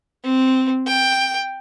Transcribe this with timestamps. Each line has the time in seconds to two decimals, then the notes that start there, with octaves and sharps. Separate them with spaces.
0.24 C4
0.87 G5